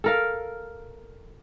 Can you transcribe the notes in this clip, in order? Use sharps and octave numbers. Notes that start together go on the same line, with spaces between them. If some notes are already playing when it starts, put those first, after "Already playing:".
A4 A#4 F5